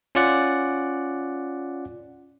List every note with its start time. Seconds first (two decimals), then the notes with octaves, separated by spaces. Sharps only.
0.15 C#4 F4 D5 F#5